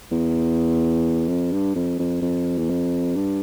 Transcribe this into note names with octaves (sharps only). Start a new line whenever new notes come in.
E2
F2
G2
F2
F2
F2
E2
F2
G2